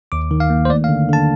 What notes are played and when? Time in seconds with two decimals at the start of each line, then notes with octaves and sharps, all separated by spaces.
0.12 D#2 D6
0.31 D#3
0.40 F5
0.50 A#3
0.65 C5
0.69 A3 D5
0.84 F5
0.89 D3
1.09 D3 A5